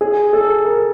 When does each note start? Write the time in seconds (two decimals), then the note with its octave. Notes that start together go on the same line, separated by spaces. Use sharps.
0.01 G#4
0.33 A4
0.65 A#4